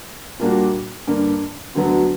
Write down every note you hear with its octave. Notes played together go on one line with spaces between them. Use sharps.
A#2 G3 A#3 D4 F#4
G2 D3 A#3
D2 D3 F#3 B3 F#4